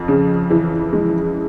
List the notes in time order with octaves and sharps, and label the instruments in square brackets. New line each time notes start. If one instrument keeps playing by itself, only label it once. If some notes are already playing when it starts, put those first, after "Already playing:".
Already playing: [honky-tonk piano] F2
C#3
E3
G#3